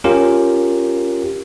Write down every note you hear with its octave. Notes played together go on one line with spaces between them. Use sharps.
C#4 F4 G4 A#4